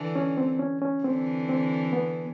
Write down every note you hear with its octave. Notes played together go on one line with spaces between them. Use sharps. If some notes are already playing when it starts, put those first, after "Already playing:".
Already playing: D3 E3
C#4
C4
C#4
C#4
D3 E3 C4
C4
B3